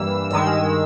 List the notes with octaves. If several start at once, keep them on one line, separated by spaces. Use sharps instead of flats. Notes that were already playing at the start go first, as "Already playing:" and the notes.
Already playing: G2 E3 G3 A#3 E6
G2 D#3 G#3 E6